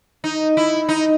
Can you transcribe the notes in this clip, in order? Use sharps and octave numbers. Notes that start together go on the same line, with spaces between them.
D#4
E4
D#4